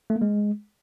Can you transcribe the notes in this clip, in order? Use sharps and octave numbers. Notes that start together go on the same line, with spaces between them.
A3
A#3
G#3